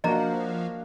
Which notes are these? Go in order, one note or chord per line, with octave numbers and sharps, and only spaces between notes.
F3 A#3 D4 F#4 D#5 A#5